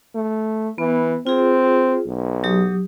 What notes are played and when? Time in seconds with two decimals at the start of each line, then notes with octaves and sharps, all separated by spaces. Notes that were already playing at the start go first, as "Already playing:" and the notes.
0.15 A3
0.78 E3 B3
1.27 C4 F4 G#4
2.06 B1
2.44 F#3 G4 D#6